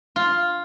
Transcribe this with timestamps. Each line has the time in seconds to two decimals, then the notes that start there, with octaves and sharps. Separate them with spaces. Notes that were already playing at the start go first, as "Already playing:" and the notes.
0.16 F4